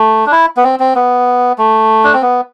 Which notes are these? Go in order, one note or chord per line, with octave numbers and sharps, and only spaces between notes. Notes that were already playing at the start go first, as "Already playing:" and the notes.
Already playing: A3
D4
E4
B3
C4
C4
B3
A3
D4
C4
B3